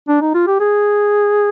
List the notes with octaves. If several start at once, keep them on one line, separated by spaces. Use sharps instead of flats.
D4
D#4
F4
G4
G#4